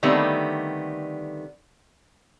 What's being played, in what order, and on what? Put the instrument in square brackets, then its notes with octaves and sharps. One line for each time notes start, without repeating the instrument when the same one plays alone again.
[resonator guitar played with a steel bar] D3 D#3 G3 A3 B3 C4